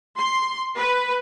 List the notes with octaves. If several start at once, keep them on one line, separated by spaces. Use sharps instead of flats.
C6
B4